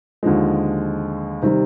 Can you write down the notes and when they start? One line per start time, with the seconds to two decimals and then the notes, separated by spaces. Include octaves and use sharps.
0.23 D#2 D3 F3 G#3
1.42 C3 D#3 G3